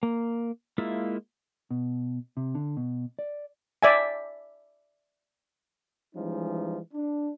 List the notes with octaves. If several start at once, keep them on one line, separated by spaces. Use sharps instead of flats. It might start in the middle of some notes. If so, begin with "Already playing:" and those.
A#3
G#3 A#3 E4 F4 E5
B2
C3
D3
B2
D5
D5 E5 G#5
E3 F3 G3 G#3 C#4 D#4
D4